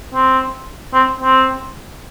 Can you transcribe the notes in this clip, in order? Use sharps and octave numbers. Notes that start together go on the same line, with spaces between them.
C4
C4
C4